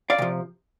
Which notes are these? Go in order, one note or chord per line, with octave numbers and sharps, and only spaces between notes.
D5 F5
C3 F3